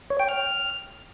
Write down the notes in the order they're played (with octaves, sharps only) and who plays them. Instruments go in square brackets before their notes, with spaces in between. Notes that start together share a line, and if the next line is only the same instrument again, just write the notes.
[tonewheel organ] C#5
G5
F6